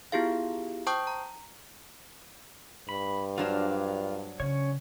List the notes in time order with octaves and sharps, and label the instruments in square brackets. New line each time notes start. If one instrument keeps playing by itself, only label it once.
[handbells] B3 E4 F4 G4 G#4 F5
C5 G5 A5 C#6 D#6 G6
A#5
[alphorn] G2 [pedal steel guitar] B5
[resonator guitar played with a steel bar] F#3 D4 C5 [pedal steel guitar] F4 A#4 F5
[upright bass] C#3 [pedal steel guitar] C#4 C#5